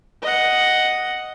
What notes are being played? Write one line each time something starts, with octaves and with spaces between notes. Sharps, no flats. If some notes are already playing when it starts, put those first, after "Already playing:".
D#5 F#5